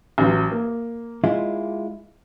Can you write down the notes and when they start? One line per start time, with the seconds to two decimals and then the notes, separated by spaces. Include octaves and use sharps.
0.18 A1 F#3
0.51 A#3
1.24 G#3 E4 F4